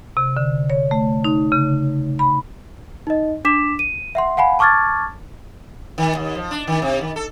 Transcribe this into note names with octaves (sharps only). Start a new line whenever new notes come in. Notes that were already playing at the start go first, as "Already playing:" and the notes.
C3
D3
C#5
A3
D#4
C#3
B5
D#4 D#5
D4 D6 B6 E7
D#7
E5 F#5 C6
F5 F#5 G#5 B5
A5 C#6 D6 F6 G#6 A6
D#3
D#2
F3
D4
D#3
C3
D#3
A4